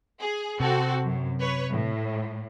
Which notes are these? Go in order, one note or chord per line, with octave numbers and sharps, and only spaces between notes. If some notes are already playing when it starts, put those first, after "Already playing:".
G#4
C3 C4 F#4 A4
F#2
B4 C#5
A2